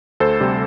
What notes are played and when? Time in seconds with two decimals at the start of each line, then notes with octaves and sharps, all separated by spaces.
0.20 D2 A4 C5
0.40 C3 G3 C4